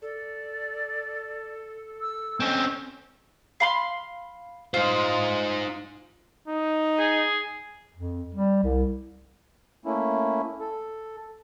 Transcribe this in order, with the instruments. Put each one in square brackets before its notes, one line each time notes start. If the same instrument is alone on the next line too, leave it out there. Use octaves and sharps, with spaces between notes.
[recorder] A4 [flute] D5
[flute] E6
[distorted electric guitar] C4 C#4 [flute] D#5
[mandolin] F5 B5 C6
[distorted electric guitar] D#4 C5 [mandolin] F4
[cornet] D#4
[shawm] G#4
[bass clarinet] F2
G3
C2
[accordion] A3 A#3 C#4 E4
A4